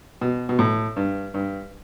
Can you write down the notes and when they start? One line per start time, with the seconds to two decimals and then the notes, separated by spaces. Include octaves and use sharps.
0.21 B2
0.49 B2
0.59 A2
0.97 G2
1.34 G2